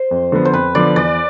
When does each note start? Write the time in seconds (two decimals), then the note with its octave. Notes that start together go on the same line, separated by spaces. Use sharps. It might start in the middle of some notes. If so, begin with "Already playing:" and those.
Already playing: C5
0.11 F2
0.32 D3 F3 B3
0.45 C5
0.53 F2 B4
0.75 D3 F3 B3 D5
0.96 E2 D5